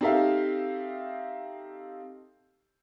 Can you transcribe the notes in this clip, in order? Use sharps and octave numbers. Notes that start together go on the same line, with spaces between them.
C4 D#4 G4 A4 E5 F5